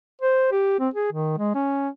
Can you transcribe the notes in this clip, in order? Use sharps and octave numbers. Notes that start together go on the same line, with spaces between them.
C5
G4
C4
G#4
D#3
G#3
C#4